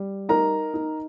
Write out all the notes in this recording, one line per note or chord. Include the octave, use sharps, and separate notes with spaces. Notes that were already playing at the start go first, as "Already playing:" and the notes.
Already playing: G3
D#4 A#4 A#5
D#4